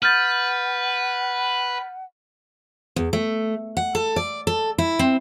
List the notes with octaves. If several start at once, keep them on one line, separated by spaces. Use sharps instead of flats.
B4 F#5 F6 G6 A6
E2
A3
F#5
A4
D5
A4
E4
C4